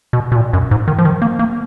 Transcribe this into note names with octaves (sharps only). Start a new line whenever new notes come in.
B2
B2
A#2
F#2
G#2
D#3
F3
D#3
A#3
A#3